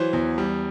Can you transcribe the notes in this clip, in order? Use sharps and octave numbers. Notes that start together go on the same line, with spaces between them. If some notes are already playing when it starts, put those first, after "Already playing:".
Already playing: E3 F#3 C5
E2
G3